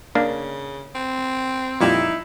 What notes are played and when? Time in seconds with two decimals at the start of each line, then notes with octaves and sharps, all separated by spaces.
0.15 C#3 A#3 D4
0.95 C4
1.81 F2 A#2 G3 D#4 E4